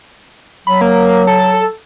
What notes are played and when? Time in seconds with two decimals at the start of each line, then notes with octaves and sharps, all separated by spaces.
0.67 F#3 B5
0.81 A#3
1.27 A4